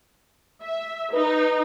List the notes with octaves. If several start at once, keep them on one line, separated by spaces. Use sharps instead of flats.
E5
D#4 B4